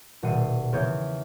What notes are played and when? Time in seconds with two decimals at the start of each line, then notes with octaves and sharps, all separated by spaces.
0.23 D#1 B2 E6 C7 C#7 D#7
0.73 E2 C#3 E4 G#4 C#5 G6